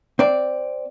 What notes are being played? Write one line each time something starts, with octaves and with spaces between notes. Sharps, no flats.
C4 D5